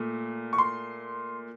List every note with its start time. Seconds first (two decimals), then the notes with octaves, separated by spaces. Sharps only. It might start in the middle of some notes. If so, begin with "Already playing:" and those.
Already playing: A#2 A3
0.53 C#6
0.58 C6